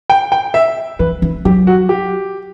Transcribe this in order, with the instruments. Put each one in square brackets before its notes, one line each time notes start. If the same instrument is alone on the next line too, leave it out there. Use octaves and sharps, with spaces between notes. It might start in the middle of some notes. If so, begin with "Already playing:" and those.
[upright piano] G5
G5
E5
[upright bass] E3 [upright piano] B4
[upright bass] E3
[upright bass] F#3 [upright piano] G4
[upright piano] F#4
G4